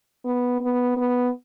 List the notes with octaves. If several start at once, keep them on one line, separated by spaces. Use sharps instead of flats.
B3
B3
B3